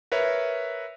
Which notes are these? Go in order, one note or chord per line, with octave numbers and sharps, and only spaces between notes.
A#4 B4 C#5 E5